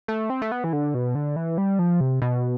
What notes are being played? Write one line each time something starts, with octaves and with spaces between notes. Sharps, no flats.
A3
C4
A3
B3
E3
D3
B2
D3
E3
G3
F3
C3
B2